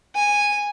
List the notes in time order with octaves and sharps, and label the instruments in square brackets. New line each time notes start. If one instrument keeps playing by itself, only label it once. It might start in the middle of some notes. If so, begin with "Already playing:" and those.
[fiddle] G#5